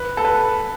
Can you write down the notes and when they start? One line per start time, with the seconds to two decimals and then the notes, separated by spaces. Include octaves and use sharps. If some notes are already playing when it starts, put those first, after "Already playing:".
Already playing: B4
0.17 A4
0.25 B4